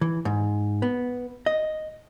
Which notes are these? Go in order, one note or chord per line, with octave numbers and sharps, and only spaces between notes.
E3
G#2
B3
D#5